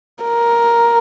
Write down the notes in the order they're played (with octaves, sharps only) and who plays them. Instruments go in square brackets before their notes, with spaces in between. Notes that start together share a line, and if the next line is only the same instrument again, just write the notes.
[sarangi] A#4